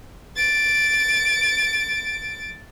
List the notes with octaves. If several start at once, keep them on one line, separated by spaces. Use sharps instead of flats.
A6 D7